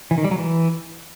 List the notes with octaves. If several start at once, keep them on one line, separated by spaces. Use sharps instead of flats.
E3
D#3
G3
F#3
E3